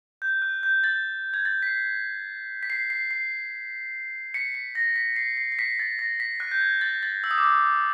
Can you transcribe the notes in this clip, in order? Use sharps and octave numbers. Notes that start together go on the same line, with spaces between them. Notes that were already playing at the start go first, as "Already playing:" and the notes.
G6
F#6
G6
A6
G#6
A6
B6
C7
B6
C7
C7
C7
B6 C#7
B6
A#6
B6
C7
C7
C7
B6 C#7
A6
A#6
B6
F#6
G6
G#6
A6
A6
E6
D#6
D6
D#6